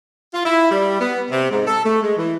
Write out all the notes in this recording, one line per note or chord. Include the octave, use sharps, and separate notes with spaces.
F4
E4
G3
B3
C3
G#2
A4
A3
G#3
E3